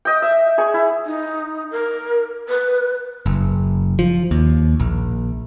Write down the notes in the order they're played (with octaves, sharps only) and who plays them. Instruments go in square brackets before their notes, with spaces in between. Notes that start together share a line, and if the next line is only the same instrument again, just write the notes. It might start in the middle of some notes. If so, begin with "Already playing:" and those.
[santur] D#5 G5
E5
G#4 C#6
E4
[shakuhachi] D#4
A#4
B4
[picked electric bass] F#1
F3
D#2
A#1